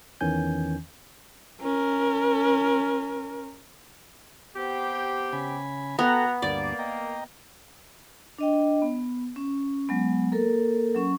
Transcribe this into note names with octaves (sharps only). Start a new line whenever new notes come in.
E2 D#3 E3 C#4 G#5 G6
C#4 A#4
B3 C4 G4
C#3 G#5 B5
B2 B3 A4 F#5 G5 A#5
D2 G2 A#3 D5 D6
D#5 G5 A#5
D4 D#5 G5
B3
C#4
F#3 G#3 B3
A#3 A4 A#4
F#3 C#4 C#6